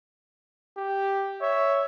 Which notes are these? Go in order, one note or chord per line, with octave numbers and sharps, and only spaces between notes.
G4
C#5 E5